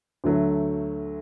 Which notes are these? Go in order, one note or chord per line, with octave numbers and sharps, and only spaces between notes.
D2 D3 F#3 A3